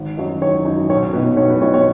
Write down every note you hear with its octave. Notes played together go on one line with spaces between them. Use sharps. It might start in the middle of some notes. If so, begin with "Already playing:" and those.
Already playing: G#1
F#2 F#3 D#4
G#1 C#5
F#2 F#3 D#4
B1 C#5
B2 B3 D#4 B4
B1 C#5
B4
B2 B3 D#4 C#5
C#5